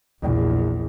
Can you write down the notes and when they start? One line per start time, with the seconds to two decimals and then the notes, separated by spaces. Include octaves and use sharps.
0.20 A#1 E2